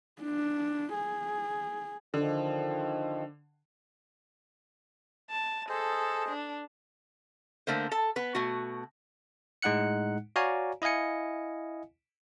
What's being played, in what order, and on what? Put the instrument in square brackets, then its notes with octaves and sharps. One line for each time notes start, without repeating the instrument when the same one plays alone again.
[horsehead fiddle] D4
G#4
[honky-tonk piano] D3 [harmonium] D#3 F3
[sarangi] A5
[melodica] G#4 C5 D#5 [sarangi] A4
[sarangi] D4
[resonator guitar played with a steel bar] D3 A3 A#3 C5
A4 A5
B3 B4
B2 A3 F#4
[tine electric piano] A2 G#3 D#4 F#5 F#6 C#7
F#4 C#5 D5 F5 G#5 A#5
E4 D#5 F5 G#5 C#7